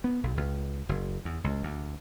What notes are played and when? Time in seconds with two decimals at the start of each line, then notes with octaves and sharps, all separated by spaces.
0.04 B3
0.23 B1
0.37 C#2
0.89 F#1
1.25 E2
1.44 C#2
1.63 D2